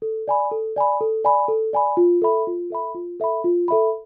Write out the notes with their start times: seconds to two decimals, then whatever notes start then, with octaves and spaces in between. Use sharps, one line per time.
0.02 A4
0.28 D5 G#5 B5
0.51 A4
0.76 D5 G#5 B5
1.01 A4
1.24 D5 G#5 B5
1.48 A4
1.73 D5 G#5 B5
1.97 F4
2.22 A4 E5 B5
2.47 F4
2.70 A4 E5 B5
2.95 F4
3.20 A4 E5 B5
3.44 F4
3.68 A4 E5 B5